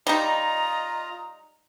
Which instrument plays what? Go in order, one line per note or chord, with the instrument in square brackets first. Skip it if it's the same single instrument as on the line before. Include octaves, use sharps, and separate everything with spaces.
[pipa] G3 D#4 [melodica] F4 D#5 [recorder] A#5